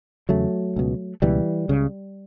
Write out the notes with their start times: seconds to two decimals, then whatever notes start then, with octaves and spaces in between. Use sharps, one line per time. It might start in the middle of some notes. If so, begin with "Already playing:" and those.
0.29 E2 C#3 F#3 A3
0.76 C#2 B2
1.22 C#2 B2 E3 G3
1.69 C#2 C#3